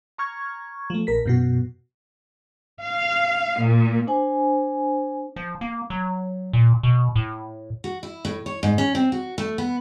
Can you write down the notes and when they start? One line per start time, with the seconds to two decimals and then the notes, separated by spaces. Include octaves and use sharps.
0.18 A#5 C#6 F6 G#6
0.90 F3 A3
1.07 A#1 A#4 B6
1.26 F#2 B2 F#4
2.82 F5
3.62 A#2
4.07 D4 C5 G#5
5.36 F3
5.61 A#3
5.90 F#3
6.53 A#2
6.83 B2
7.16 A2
7.84 F#4
8.03 E4
8.25 A2
8.46 C#5
8.63 G#2
8.78 C#4
8.95 C4
9.12 F#4
9.38 A3
9.58 B3